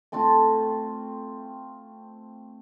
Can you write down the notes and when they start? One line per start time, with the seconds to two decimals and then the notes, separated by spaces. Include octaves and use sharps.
0.12 A3 C4 F4 A5